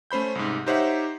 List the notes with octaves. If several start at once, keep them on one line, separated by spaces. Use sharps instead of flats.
A3 C#4 C5 B5 G6
C2 G#2
D#4 G4 C5 C#5 E5 F#5